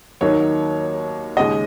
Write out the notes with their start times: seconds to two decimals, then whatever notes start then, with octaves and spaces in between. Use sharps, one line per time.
0.21 D#2 D#3 F#3 A#3 D#4 C#5
1.37 D#2 C#3 G#3 D#5